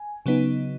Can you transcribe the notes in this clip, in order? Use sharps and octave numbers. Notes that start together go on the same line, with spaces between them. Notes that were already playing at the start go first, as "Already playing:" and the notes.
Already playing: G#5
C#3 F#3 B3 D#4